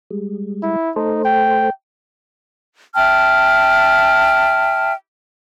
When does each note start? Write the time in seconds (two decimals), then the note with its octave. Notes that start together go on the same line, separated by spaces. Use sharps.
0.11 G3 G#3
0.63 E4
0.96 A3 D#4 A4 C5
1.25 G5
2.95 E5 G5 A5 F6